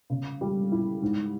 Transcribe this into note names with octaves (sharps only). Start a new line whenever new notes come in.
C#3
G3
E4
G#2